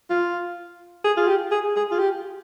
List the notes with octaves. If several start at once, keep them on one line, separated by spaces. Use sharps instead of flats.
F4
G#4
F4
G4
G#4
G#4
F4
G4